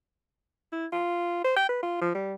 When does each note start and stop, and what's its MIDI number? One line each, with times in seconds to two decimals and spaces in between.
0.72 0.86 64
0.93 1.44 65
1.44 1.53 72
1.56 1.67 79
1.69 1.79 71
1.83 1.98 65
2.01 2.12 53
2.15 2.34 55